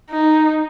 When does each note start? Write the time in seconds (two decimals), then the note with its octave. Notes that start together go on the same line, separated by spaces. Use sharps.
0.10 D#4